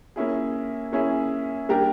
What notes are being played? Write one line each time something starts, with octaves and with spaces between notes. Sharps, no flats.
A#3 C#4 E4 G#4
A#3 C#4 E4 G#4
G3 A#3 D4 G4 A#4